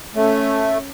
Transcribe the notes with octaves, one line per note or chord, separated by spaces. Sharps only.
A3 C#4